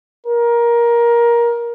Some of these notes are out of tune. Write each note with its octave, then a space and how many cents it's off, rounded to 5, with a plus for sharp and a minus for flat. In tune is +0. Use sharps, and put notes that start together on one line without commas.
A#4 +15